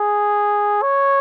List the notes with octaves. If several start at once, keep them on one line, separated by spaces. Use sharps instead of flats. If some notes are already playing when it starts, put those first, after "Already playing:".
Already playing: G#4
C#5